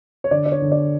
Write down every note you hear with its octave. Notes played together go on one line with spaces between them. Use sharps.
C#5
D3 D5
D5
C#5
D3
D5